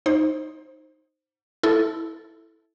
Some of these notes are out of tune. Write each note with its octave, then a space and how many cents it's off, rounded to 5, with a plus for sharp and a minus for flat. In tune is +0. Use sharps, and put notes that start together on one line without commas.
D#4 +0 C5 +10
E4 -5 A4 -5